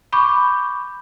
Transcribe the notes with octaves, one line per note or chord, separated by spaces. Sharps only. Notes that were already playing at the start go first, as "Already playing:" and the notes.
B5 C#6 D6 G6